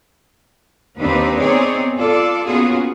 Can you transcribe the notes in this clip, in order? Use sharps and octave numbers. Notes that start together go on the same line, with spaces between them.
D#2 C4 D4 D#4 B4
B3 C4 D#4 G#4 C#5 D5
F4 A4 D5
A#3 B3 C#4 F4 F#4 G#4